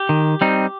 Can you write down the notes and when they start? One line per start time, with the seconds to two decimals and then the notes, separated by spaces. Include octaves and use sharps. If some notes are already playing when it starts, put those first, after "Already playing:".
Already playing: G4
0.09 D#3
0.41 G3 C4 D#4